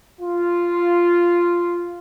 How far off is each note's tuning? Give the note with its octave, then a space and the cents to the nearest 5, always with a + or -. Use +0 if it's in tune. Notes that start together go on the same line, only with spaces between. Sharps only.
F4 -5